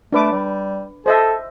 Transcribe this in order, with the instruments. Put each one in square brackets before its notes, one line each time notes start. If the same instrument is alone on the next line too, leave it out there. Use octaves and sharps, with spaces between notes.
[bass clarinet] A3 [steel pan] D4 B4 D6
[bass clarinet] G3
[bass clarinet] A4 [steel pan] C5 D#5 E5